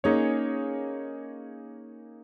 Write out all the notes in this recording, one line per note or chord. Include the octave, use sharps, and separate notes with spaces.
A#3 C#4 D#4 G#4 C#5